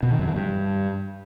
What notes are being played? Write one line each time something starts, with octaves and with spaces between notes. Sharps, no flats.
B2
D#3
F#2
E3
G2